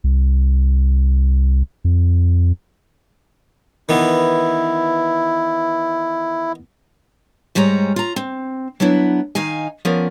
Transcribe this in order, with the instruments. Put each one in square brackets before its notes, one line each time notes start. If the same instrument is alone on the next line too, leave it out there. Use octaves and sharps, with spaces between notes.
[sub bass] C2
F2
[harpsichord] D#3 E3 B3 [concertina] E4
[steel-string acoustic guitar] G#2 G3 G#3 C#5 A#5
F4 A#5
C4
F#3 B3 D4 E4
D#3 D#4 F5 G#5
F3 B3 C#4 A#4 D5